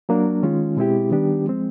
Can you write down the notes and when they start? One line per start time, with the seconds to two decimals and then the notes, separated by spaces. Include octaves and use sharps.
0.09 F#3 A#3 D4
0.43 D#3 G#3 C#4 F4
0.77 B2 G#3 C4 E4 G4
1.11 D#3 G3 B3 D4 G4
1.45 F3 G#3 C4